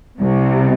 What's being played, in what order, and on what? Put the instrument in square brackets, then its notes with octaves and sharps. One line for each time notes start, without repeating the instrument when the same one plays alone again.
[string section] C2 C3